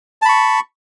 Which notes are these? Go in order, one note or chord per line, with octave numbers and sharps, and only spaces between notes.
A5 B5 C#6